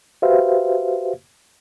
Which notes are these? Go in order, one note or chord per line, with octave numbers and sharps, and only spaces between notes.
F#4 G4 B4 C5 E5 F5